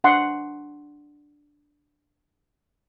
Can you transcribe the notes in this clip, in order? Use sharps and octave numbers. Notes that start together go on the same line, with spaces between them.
D4 F#5 C6